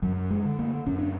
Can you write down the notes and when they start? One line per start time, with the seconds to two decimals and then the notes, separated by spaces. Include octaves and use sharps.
0.02 F#2 F#3
0.31 G#3
0.45 D3
0.59 A#3
0.87 F#2 C#4
0.99 D4